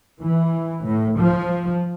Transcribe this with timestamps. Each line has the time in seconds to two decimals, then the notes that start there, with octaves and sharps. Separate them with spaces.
0.20 E3
0.85 A2
1.18 F3